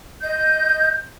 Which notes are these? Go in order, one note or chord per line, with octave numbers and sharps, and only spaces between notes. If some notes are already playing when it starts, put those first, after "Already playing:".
D#5 G6